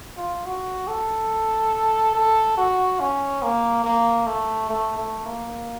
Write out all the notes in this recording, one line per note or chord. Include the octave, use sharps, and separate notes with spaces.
F4
F#4
A4
A4
F#4
C#4
A#3
A#3
A3
A3
A3
A#3